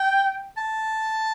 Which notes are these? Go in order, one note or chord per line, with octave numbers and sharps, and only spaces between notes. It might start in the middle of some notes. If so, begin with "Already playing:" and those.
Already playing: G5
A5